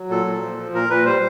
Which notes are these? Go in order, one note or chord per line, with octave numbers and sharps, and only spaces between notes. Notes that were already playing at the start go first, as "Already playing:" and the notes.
Already playing: F#3
A#2 A4
A#2
F3
F3
A#2 A#4
A#2 B4
G3 C5